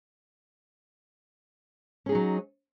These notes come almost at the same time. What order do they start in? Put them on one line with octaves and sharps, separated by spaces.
C#4 G#4 D#4 F#3